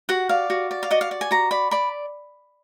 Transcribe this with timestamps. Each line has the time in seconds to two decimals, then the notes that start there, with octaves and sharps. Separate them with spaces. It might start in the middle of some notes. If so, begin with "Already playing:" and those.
0.09 F#4 F#5
0.29 D5 F5
0.50 F#4
0.71 D5
0.83 F5
0.91 F#4 D#5
1.01 F5
1.11 D5
1.21 G#5
1.31 F#4 A#5
1.51 D5 B5
1.71 D5 B5